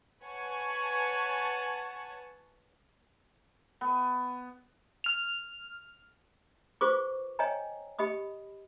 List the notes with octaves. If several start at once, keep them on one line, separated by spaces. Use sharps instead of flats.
B4 C#5 F#5 G#5 A5 C#6
B3
F6 F7
F4 G#4 B4 C5 C#6 D6
C#5 D#5 G5 G#5 A#5
G4 D#5 B5 D#6